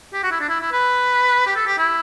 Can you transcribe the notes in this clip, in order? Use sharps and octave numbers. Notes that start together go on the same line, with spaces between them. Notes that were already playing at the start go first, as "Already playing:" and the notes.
G4
F#4
E4
D4
E4
E4
B4
G4
A4
G4
E4